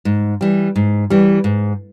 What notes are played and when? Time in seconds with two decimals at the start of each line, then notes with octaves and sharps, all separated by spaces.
0.05 G#2
0.41 E3 G3
0.76 G#2
1.10 E3 G3
1.44 G#2